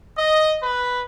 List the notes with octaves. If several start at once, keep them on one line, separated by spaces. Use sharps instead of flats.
D#5
B4